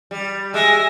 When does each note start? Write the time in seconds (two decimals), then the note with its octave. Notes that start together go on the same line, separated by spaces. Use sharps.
0.11 G3
0.54 G#3 E5 G#5 A#6